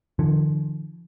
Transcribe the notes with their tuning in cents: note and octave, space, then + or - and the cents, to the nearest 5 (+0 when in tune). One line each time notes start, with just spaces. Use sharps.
D3 +30 F3 -35